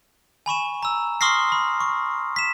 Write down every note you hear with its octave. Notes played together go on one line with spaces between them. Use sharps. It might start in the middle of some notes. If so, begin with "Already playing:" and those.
G#5 B5 C#6 E7
A#5 E6
C6 C#6 D#6 F6 A#6 C7
B5
C#6
B6 E7